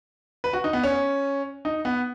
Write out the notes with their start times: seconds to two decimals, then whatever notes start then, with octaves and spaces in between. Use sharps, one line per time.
0.44 B4
0.53 F#4
0.64 D#4
0.73 B3
0.83 C#4
1.65 D#4
1.85 B3